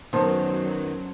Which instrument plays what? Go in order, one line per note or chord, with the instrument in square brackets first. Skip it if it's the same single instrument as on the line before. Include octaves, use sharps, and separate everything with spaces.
[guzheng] F#2 [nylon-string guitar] D#3 B3 [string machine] F#3 [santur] C5 A5